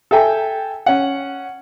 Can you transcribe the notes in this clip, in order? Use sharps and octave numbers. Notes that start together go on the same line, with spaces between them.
A4 E5 G5 G#5
C#4 F#5